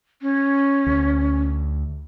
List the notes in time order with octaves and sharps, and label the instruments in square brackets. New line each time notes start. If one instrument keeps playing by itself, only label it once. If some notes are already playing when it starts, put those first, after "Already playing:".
[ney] C#4
[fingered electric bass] D2